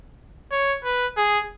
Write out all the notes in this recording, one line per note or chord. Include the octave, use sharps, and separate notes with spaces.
C#5
B4
G#4